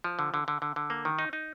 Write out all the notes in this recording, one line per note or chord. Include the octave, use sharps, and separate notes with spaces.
F3
D3
D3
D3
D3
D3
A#3
D#3
D#4
D#4